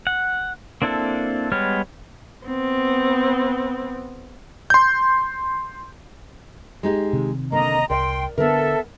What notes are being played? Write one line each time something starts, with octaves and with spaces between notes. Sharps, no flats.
F#5
A#3 C4 D4 E4 A4
G3 G#3 B3 C#5 F6
B3 C4
C6 G6
G#3 D#4 G4
C3 D#3
D3 A#3 D#5 A#5
C2 A#4 D5 E5 G5 C6
D3 B3 A4 A#4 E5